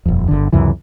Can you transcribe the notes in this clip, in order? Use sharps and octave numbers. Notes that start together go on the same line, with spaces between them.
D#1 F2
G1 D3
C#2 F#2 C3 E3